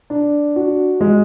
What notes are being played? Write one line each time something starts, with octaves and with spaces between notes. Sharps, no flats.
D4
F#4
G#3